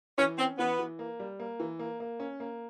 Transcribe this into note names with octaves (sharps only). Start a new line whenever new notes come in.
E3 C#4
C4 C#4
E3 B3
E3
A#3
G3
A#3
E3
A#3
A#3
C#4
A#3